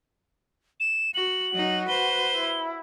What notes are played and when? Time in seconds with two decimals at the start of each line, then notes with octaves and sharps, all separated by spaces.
0.80 E7
1.15 F#4 F#7
1.53 F#3 D#4 F#4
1.88 B4 C5 G7
2.35 E4